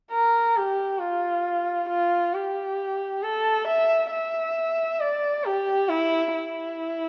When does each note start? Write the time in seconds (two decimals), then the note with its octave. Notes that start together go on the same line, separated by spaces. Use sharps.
0.11 A#4
0.56 G4
1.01 F4
1.89 F4
2.35 G4
3.23 A4
3.67 E5
4.11 E5
5.00 D5
5.45 G4
5.89 E4
6.34 E4